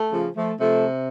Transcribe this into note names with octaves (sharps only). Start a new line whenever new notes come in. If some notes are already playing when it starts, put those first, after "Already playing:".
Already playing: A3
C#3 F3
F3 A3
C3 F3 A3